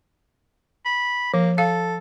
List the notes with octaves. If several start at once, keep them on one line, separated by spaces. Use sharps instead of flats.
B5
F3 A#3
A4 F5